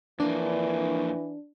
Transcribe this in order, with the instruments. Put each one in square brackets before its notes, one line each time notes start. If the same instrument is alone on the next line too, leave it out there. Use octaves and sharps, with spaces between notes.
[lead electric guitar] F2 A#3 [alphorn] E3 [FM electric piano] D4